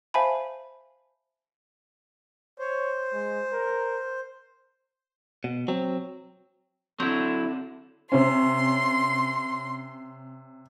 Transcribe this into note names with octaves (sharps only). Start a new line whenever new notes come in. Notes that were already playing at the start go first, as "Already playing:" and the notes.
C5 E5 F5 G#5 A5 B5
C5 C#5
G#3
A#4
B2
F#3 C4
D3 F#3 C4 E4
C3 C#4 C6